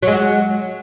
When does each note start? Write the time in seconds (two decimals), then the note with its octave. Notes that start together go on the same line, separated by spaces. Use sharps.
0.03 F#3
0.07 G#3
0.12 F#4